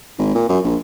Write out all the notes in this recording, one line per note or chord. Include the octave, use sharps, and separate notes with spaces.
G#1
A#2
F#2
A#1